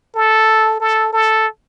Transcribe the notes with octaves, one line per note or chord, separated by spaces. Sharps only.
A4
A4
A4